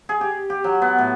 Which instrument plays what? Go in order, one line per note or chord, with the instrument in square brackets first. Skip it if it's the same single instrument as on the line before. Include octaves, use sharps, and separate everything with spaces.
[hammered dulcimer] G#4
G4
G4
F#3
B3
A2